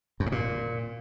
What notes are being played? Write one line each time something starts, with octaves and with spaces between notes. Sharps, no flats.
F#2
G#2
A#2